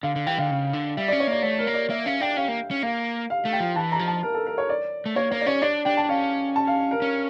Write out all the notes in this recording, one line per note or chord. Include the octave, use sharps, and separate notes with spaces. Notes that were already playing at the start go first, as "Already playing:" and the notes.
D3 F5
D3
E3 G5
D3 F5
C#3
D3
G3 E5
C#4 D5
C#5
A#3 D5
A3 C#5
A#4
A#3
D5
A#3 E5
C#4 F5
D4 G5
C#4 F5
A#3
C#4
A#3 F5
F5
A3
G5
F3
E3 A5
A#5
F3
A5
A#4
A4
A#4
C#5
D5
A3
A#3 C#5
A#3 C#5
D5
C#4 C#5
D4 D5
D4 G5
A5
C#4 F5
A5
F5
A#4
C#4